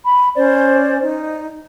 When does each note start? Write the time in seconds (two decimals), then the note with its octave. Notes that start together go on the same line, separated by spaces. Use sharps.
0.04 B5
0.36 C#4 C5 D5
1.02 D#4